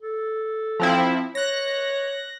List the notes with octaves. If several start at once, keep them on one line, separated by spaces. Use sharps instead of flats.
A4
F3 C4 E4
C#5 F#6 A#6